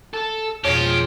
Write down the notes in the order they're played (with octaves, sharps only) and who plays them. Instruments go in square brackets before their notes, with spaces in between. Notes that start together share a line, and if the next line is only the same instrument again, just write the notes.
[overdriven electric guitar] A4
[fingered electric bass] F2 B2 [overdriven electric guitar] F3 [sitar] G#3 C#5 [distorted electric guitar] G4